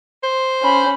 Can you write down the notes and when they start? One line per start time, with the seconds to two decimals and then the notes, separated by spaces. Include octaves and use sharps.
0.23 C5
0.63 C#4 B5